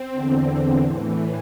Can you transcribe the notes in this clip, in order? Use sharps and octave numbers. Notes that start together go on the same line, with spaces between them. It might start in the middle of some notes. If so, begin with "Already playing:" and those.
Already playing: C4
E2 D3
A2 E3